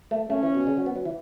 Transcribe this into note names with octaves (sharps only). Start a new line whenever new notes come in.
A3
A3 C#4
E3
B2
C#3
F#3
B3
F#3
E3